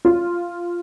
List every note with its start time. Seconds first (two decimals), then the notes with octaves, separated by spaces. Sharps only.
0.05 F4